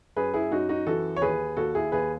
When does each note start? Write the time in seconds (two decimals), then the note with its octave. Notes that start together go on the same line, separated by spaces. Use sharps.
0.16 F#2 G#4 B4
0.34 E4 G#4
0.51 F#2 D#4 F#4
0.69 D#4 F#4
0.87 E3 F#4 A4
1.16 C#5
1.22 D#2 G#4 B4
1.57 D#2 F#4 A4
1.75 E4 G#4
1.92 D#2 G#4 B4